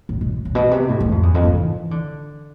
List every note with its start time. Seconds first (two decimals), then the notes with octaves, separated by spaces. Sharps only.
0.09 A2
0.21 B2
0.45 A2
0.55 B2
0.71 C3
0.89 A2
1.00 G#2
1.12 F2
1.23 E2
1.34 F2
1.45 G#2
1.57 E3
1.91 D3